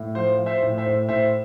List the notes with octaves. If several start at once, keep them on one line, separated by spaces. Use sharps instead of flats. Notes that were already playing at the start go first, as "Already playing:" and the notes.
Already playing: A2
F3 C5
F3
C5 E5
A2
C5 E5
A2
A2 C5 E5